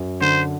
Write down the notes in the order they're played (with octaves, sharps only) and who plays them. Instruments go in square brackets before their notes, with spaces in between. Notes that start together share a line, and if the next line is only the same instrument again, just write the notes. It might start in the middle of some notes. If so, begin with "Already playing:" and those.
Already playing: [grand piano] F#2
[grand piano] D3 [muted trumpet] C5